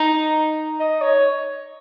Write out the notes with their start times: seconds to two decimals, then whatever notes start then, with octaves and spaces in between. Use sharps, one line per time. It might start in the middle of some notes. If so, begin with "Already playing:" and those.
Already playing: D#4
0.80 D#5
1.02 C#5